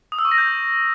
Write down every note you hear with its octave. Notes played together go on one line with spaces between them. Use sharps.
D#6
E6
C#6
A#6
G6